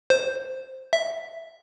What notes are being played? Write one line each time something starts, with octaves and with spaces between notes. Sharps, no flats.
C5
E5